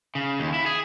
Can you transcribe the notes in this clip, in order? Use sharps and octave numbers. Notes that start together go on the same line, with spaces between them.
C#3
D#2
E4
G#4